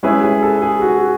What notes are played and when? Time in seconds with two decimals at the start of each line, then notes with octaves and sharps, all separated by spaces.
0.03 G#3 C#4 E4 G#4 B4 E5
0.23 G#4
0.43 A4
0.62 G#4
0.82 F#4